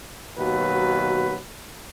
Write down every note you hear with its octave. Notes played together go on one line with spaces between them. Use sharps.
D#2 B2 F#3 F#4 B4